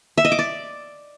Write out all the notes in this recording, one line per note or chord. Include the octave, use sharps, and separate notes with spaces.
E5
D#5
D6
D5